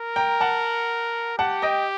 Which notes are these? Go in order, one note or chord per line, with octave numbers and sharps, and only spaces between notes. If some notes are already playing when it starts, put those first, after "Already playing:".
Already playing: A#4
G5 A#5
F#5 A5
G4 F#5 A5
D#5 G5